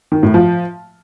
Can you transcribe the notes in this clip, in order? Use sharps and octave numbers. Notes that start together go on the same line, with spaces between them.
D#3
A2
F3